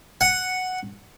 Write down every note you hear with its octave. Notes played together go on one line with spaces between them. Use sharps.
F#5